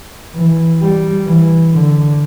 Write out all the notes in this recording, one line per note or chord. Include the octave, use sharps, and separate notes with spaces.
E3
G3
E3
D3